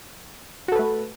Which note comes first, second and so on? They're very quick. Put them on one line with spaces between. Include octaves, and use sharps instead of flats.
F#4 A4 B4 A3